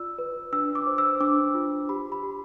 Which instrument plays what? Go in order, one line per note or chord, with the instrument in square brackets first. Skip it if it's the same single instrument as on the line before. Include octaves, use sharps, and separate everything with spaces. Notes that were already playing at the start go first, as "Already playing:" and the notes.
Already playing: [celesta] F4 D5 E6
B4
D4 E6
D6
C5
E6
D4 D6
F4
G4 B5
B5
G4